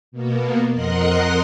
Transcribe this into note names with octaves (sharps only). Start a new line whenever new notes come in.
B2 A#3 B3
F2 A#4 D#5 F#5 C6 F#6